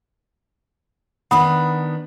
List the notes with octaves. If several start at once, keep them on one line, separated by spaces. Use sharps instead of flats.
D#3 B3 D4 F#5 B5 D#6